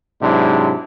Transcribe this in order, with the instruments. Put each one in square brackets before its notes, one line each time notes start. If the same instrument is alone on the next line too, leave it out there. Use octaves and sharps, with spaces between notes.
[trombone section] G#2 C3 F#3 G#3 D4 E4